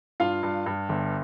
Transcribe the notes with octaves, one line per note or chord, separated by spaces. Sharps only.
G2 F4 F5
G2
G2
G1